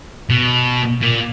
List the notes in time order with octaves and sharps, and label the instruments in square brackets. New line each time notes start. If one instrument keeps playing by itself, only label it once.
[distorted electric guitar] B2
A#2